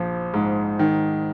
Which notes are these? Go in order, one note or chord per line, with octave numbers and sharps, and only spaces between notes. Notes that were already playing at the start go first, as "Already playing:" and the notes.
Already playing: A#1 F3
G#2
D#3